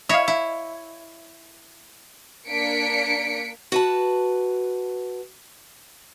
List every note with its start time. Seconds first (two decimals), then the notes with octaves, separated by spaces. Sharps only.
0.09 E4 C#5 D#5 F5
0.28 E4
2.49 A#3 D4 B6 C#7 D7
3.72 F#4 B4 A5